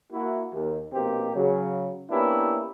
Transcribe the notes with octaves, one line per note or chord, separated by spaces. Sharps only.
A#3 E4 F#4
D#2
A#1 B2 A#3 C4 D#4 G4
C#3 F#3
A#3 B3 C#4 D4 E4 G4